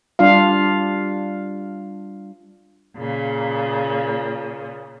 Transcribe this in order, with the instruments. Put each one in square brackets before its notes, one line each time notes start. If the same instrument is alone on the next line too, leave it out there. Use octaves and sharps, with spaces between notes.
[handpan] G3 D4 F4 F5
[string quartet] A#2 C#3